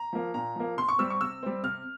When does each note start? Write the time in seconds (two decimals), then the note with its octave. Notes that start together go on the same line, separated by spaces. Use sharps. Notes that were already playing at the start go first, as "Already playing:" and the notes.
Already playing: A#5
0.13 F3 A#3
0.34 A#2 A#5
0.56 F3 A#3
0.77 C3 C6
0.89 C#6
0.98 G3 C4 E6
1.10 C#6
1.21 C3 E6
1.43 G3 C4
1.63 C3 F6